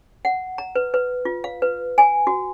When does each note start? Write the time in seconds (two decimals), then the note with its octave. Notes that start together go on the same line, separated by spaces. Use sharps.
0.25 F#5
0.58 A#5
0.75 B4
0.94 B4
1.25 F4
1.44 F5
1.62 B4
1.98 G#5
2.27 F#4